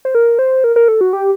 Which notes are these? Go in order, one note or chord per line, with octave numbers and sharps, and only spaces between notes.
C5
A#4
C5
A#4
A#4
A4
F#4
G4